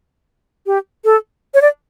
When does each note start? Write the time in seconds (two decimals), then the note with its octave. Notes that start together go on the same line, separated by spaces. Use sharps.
0.66 G4
1.05 A4
1.54 C#5
1.61 D5